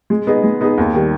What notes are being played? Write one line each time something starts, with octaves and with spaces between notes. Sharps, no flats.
G#3
B3 D#4 G#4 D#5
G#3
B3 D#4 G#4 D#5
D#2
D#3 G3